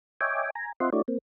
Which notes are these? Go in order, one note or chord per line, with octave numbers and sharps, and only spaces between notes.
C#5 D#5 E5 G5 G#5 D6
G#5 A#5
C4 F4 D#5 E5 F#5 C6
A3 D4 E4 F#4 C#5 D5
A#3 C4